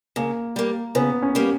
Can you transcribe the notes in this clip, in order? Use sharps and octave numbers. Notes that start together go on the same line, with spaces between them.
C#3 A#3
G3 A#3
C#3 B3
C#4
G3 A#3